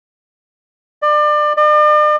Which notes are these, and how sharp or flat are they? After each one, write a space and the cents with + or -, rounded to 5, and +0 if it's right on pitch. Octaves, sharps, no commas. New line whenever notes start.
D5 +30
D5 +45